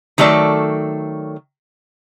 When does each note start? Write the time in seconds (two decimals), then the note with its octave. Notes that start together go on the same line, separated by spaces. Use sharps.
0.18 D#3 F#3 A3 A4 D5